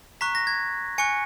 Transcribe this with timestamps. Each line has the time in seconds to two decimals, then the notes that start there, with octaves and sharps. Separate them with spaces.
0.21 A#5 C#6 F#6 B6
0.35 A#6
0.47 G#6
0.98 G#5 C#6 F#6 C#7